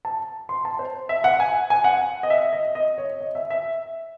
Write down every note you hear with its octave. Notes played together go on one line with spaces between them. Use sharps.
A5
C6
A5
C5
E5
F#5
G#5
G#5
F#5
D#5
E5
D#5
D#5
C#5
D#5
E5
E5